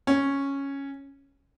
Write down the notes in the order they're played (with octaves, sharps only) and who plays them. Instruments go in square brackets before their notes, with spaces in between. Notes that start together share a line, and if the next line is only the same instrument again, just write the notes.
[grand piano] C#4